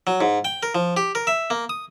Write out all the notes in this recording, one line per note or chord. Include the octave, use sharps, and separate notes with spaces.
F#3
G#2
G5
A#4
F3
G4
A#4
E5
A#3
D#6